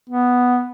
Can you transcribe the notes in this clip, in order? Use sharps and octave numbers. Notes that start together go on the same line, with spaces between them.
B3